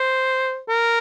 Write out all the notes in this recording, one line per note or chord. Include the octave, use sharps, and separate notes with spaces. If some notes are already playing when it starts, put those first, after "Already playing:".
Already playing: C5
A#4